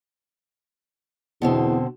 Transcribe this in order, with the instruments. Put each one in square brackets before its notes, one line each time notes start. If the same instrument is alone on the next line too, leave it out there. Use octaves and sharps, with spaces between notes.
[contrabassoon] E2 [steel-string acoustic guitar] B2 D3 C4